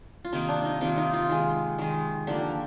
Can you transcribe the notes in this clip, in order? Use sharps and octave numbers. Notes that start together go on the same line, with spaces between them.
F4
C3 D#3 A#3 D#4
D4
D#4
C3 D#3 A#3 F4
D#4
F4
D#3 G#3
D#3 G#3
D3 F3 A#3 G4